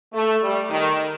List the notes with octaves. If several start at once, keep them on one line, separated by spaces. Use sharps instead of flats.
A3
G3
D#3